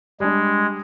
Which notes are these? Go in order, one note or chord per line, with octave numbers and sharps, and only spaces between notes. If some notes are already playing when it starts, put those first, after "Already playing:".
G3 G#3 D4